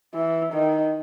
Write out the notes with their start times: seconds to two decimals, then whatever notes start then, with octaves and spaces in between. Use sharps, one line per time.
0.14 E3
0.54 D#3